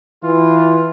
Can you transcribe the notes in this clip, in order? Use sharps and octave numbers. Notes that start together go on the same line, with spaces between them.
E3 F4